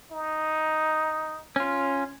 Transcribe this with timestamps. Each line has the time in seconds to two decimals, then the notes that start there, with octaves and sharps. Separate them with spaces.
0.12 D#4
1.56 C#4 F4